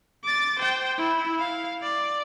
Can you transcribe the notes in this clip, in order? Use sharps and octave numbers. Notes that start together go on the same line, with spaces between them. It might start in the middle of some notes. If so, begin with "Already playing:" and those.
D6 A6
C5 G5
E4
F5
D5